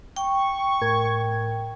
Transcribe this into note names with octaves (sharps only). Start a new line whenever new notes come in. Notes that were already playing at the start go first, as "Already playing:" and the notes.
G5 C#6
A2 A#4 G#6